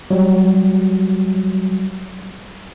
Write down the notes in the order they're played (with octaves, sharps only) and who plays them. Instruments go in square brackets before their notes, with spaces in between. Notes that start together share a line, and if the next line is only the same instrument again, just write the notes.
[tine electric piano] F#3 G3